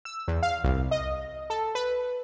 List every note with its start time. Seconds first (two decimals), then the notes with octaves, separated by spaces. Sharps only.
0.05 E6
0.28 E2
0.43 F5
0.64 C2
0.91 D#5
1.50 A4
1.75 B4